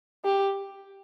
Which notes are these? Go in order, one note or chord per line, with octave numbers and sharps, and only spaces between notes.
G4